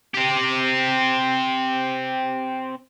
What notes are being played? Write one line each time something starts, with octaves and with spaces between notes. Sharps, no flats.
C4 G4